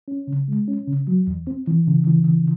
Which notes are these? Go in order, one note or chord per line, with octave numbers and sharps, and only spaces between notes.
C#4
C#3
G#3
C#4
C#3
F#3
E2
C4
E3
C#3
E3
C#3